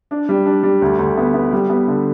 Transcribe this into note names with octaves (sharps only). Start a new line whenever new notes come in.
D4
G3
D4
G3
D2
D2
B3
B3
G3
B3
D3